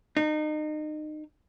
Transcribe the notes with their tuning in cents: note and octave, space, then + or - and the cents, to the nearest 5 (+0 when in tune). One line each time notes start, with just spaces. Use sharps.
D#4 -30